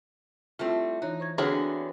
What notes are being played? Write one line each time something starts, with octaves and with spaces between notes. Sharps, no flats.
G3 A3 C4 E4 F4
E3 D#4 C#5 F#6
C5 C#6 G#6
D3 E3 F#3 B3 C4 G#4 E5 F6